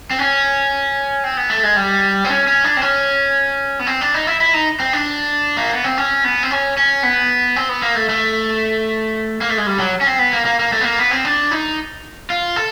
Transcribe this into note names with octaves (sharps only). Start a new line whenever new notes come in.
C4
C#4
C4
B3
A3
G#3
G3
C4
C#4
C#4
D4
C4
C#4
B3
C4
D4
D#4
E4
E4
D#4
C4
D4
A#3
B3
C4
C#4
B3
C4
C#4
C#4
B3
C4
B3
A#3
A3
A3
A#3
A3
G#3
G3
F#3
C#4
C4
B3
A#3
A#3
A#3
A3
B3
A#3
B3
C4
D4
D#4
F4
A4